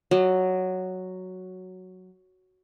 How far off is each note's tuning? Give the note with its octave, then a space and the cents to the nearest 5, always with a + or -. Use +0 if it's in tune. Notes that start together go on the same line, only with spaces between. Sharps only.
F#3 +0 D#5 -45